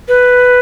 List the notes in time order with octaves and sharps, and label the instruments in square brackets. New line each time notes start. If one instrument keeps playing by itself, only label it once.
[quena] B4